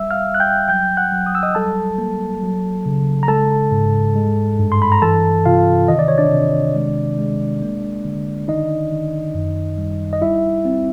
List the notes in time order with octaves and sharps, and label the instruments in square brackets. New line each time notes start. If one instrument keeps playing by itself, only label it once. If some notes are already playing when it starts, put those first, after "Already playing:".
Already playing: [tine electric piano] G3 E5 E6
F5 F6
G3
F#6
G5 G6
F#3 G5 G6
F#5 F#6
F#3
D#6
E6
D#5 D#6
G3 A4 A5
A#3
F#3
C#3
A#5
G#3 A4 A5
G#2
G#3
G2
C6
B5
A#5
E3 A4 A5
C3 F4 F5
D#3 D#5
D5
C#5
D4 D5
C3
G#3
G#3
A#3
D3
D#3 D#4 D#5
D#3
F#2
G3
D#5
G3 E4 E5
C4